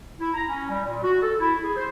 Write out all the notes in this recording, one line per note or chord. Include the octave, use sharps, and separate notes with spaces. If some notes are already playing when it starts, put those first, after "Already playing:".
E4
A#5
C#4
G3
A#2
F#4
A4
E4
G#4
C5